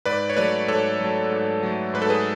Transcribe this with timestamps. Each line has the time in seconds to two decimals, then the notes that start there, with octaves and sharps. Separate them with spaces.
0.05 G#2 B4 D5
0.30 C#5
0.37 F#3 A3 B4 D5
0.68 G#2 A4 C#5
1.00 F#3 A3
1.32 G#2
1.63 F#3 A3
1.94 G#2 B4
2.02 A4
2.10 G#4 B4